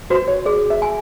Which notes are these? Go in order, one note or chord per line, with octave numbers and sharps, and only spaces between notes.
F#4 C5
C#5
G#4 D5
E5
G#5